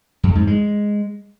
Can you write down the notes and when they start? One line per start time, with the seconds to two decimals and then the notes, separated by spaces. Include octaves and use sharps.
0.23 F2
0.35 G#2
0.47 G#3